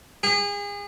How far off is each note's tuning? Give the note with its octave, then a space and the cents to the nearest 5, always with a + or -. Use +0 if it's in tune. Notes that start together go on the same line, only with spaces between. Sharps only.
G#4 -35